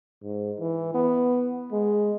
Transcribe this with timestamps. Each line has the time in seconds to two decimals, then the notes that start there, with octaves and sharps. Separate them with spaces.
0.23 G#2
0.59 E3
0.94 B3
1.72 G#3